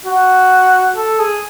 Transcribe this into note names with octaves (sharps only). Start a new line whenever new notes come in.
F#4
A4
G#4